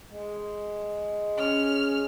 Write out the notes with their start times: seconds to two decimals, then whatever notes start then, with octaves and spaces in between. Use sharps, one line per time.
0.11 G#3
1.38 C#4 F6